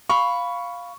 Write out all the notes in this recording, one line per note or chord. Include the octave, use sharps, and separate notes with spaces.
F5 B5 C#6